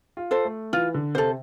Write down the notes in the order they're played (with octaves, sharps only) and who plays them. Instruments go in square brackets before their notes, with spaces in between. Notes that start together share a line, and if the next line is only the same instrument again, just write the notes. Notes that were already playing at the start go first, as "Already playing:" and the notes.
[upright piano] F4
[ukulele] A4 C5
[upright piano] A3
[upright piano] E3 [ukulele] F4
[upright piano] D3
[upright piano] C3 [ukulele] A4 C5